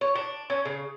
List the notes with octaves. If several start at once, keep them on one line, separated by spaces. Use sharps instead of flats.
C#5
D4
C#4
C#3